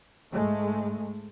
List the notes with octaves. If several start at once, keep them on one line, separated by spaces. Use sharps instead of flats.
G#2 G#3 A3